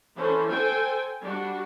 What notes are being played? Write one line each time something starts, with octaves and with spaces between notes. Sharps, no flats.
E3 C#4 A4 C5
A4 C5 G5 G#5
G3 D4 F#4